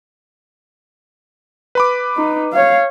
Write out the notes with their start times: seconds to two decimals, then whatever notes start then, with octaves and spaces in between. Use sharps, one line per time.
1.75 B4 B5 D6
2.17 D#4
2.53 C#5 F5